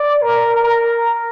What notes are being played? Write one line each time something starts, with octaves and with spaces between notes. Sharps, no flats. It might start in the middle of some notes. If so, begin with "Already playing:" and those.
Already playing: D5
A#4
A#4